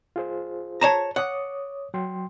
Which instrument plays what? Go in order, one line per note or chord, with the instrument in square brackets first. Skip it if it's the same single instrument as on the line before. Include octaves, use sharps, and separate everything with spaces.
[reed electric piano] F4 G#4 C5
[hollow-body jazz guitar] C#5 A5 A#5
[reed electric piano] C#5 D6 D#6 [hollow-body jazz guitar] F#5
[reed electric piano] F#3 G5 C6